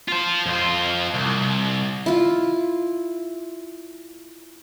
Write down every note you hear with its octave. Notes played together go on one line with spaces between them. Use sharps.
F4 C5
F2 F4
C2
E4 F4